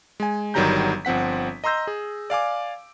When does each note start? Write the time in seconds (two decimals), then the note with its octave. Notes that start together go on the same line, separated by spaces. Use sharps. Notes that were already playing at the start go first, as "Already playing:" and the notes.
0.20 G#3 G#5
0.54 G1 D#3 F#3 G3 A#5 G6
1.05 G1 F3 C4 F#5 B6
1.64 D#5 A#5 C6 E6 G6 A#6
1.87 G#4
2.30 D5 F5 G#5 D6